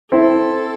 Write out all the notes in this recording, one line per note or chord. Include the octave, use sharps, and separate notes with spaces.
C4 E4 A4